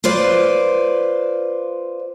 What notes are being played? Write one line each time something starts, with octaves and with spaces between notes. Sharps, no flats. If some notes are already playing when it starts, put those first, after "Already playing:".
F4 B4 C5 D5